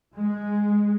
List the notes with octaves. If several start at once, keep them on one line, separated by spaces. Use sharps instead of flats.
G#3